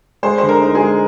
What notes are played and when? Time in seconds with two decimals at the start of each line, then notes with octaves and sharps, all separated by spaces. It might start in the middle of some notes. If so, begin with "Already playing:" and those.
0.23 G#3 C5
0.38 D3 C5
0.49 A#4
0.62 D#4
0.75 G#4
0.81 G#3